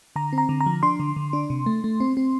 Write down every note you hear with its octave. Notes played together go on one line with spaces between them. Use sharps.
D3 A#5
C4
A#5
D3
A#5
F3
D4 C6
D3
D3
D4
C3
A3
A3
C4
C4